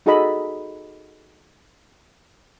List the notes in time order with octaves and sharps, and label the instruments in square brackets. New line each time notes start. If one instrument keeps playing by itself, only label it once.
[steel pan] D#4 F#4 G#4 A4 D#5 B5